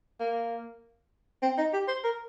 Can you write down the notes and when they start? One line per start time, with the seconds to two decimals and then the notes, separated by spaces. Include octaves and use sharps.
0.20 A#3
1.42 C4
1.58 D#4
1.73 G4
1.88 C5
2.04 A#4